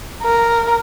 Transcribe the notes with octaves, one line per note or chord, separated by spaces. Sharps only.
A#4